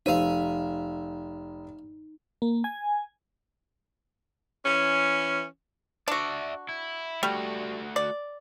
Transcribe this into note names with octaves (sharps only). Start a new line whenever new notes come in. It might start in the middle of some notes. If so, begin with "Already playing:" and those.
F1 D#4 C5 E5 F5 D#7
A#3
G#5
E3 C#4
D4 F#4 D5 E5
E4
G3 A3 F#4
D5